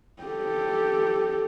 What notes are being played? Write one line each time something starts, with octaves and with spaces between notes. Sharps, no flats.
G4 A4